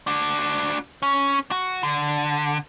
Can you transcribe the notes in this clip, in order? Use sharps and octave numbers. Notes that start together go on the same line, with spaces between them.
D4 F#4
C#4
F#4
D3